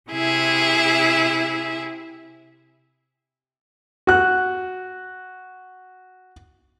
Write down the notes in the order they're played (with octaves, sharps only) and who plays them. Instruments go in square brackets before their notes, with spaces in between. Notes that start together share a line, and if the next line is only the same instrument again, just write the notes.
[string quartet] C3 E4 G#4 E5
[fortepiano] F#4 F#6